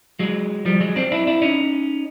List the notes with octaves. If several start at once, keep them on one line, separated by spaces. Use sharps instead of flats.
F#3 G#3
F3 G3
F#3 G#3
C4 D4
D4 E4
D4 E4
C#4 D#4